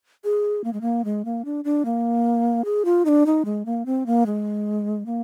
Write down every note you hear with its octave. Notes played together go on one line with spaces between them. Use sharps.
G#4
A#3
G#3
A#3
G#3
A#3
D4
D4
A#3
G#4
F4
D#4
D4
D#4
G#3
A#3
C4
A#3
G#3
A#3